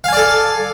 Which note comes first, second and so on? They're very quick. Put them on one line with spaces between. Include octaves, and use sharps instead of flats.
F5 G#5 D5 A4